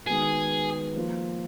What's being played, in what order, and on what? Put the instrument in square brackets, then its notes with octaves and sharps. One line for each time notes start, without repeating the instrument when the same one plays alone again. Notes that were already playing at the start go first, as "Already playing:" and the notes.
[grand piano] D#3 G#3 B3 F#4 B4 [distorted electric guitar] G#4
[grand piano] F3 A#3 F4